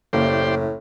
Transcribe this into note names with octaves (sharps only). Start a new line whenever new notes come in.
F#1 A2 A#3 G4 C5 D5